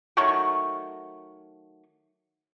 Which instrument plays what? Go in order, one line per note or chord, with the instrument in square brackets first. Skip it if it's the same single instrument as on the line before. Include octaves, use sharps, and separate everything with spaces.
[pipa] D#3 F#3 A3 C#6